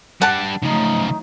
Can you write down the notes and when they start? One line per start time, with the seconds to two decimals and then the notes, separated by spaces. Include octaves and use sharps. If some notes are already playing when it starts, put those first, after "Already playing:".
0.22 G3 D4 F#5 A5
0.63 C#3 F3 F#3 A3 D#4